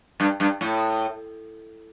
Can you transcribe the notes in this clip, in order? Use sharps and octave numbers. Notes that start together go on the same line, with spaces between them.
G2
G2
A2